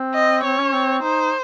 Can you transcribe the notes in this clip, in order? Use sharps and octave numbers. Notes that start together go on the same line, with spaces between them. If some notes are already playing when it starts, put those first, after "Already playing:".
Already playing: C4
D#5
C4 C#5
C#4
C4
D#4 C5